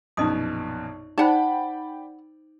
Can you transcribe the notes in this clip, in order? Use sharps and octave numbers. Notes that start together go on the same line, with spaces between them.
A#1 F#2 B2 D#4 D#5 D#6
D#4 C5 D5 F#5 G5 A5 B5